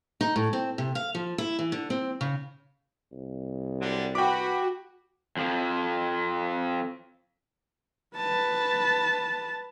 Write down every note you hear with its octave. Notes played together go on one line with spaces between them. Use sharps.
D#4
A2
C4
C3
F5
F3
E4
E3
D3
C4
C#3
C2
D3 F#3 G3
F#4 B4 G5 B5 D6
F2 F3
B4 A5